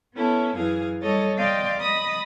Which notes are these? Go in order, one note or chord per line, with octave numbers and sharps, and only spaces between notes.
B3 C#4 E4 A4
F#2 E3 G#4 F5
G3 A4 C#5 D#5 A6
D5 D#5 F5 G5 C6 D6
D#5 B5 D#6 A6